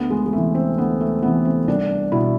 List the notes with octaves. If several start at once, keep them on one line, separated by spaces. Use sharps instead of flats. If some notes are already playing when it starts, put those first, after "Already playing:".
Already playing: D2 B3
G#3
G#3
C3 E3 A3
C4
D2 B3
A3
C3 E3 B3
C4
C2 D4
B2 E4